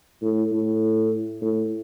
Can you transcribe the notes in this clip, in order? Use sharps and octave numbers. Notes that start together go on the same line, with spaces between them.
A2
A2
A2